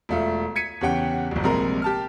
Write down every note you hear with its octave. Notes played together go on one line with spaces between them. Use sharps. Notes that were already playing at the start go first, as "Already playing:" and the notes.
E1 A3 F4
G#6 B6 C#7 D#7
E2 C#3 G4 C#5 F#5 G5
D1 G1
A#1 C3 G3 G#3 A#4 A#5
G4 A5 F6